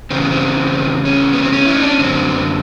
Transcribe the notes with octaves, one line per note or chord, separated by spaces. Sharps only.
E2 C#3 C4
B3
C4
C#4
B3
C4
C#4
E4
D#4
D4
C#4
F#2 D3 C4